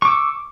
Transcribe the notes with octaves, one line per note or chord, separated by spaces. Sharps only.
C#6 D6 E6